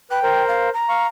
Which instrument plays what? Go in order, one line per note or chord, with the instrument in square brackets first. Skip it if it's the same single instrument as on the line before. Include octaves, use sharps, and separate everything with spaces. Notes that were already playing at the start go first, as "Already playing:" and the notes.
[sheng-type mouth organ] B4 F#6 [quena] G5
[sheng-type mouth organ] A#4 C5
[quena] F5
A#5
[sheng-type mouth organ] F5 C#6